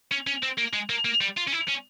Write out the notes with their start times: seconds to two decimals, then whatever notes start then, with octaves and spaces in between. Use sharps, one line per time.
0.11 C#4
0.27 C#4
0.43 C4
0.58 A#3
0.73 G#3
0.90 A#3
1.05 A#3
1.21 G3
1.37 F4
1.47 C#4
1.52 E4
1.68 C#4